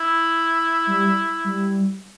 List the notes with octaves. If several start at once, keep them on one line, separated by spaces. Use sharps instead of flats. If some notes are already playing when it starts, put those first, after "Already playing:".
Already playing: E4
G3
G3